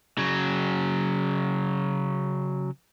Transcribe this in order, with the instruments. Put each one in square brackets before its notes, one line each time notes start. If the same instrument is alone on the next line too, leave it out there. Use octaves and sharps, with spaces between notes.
[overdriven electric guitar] C#3 F#3